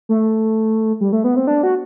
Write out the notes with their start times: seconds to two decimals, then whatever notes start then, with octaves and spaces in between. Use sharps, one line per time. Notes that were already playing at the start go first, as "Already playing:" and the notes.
0.09 A3
1.01 G3
1.12 A3
1.24 B3
1.36 C4
1.47 D4
1.63 F#4